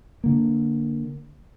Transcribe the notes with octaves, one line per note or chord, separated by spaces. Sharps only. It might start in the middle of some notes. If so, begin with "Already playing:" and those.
D3 A#3